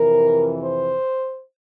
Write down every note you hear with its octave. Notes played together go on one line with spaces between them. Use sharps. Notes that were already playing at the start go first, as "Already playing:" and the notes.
Already playing: F2 C3 E3 A#4
C5